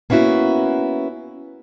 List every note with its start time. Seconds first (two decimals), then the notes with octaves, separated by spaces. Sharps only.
0.10 A#3 B3 C#4 E4 F#4